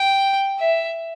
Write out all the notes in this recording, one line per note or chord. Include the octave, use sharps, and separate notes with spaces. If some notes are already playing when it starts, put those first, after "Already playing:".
Already playing: G5
E5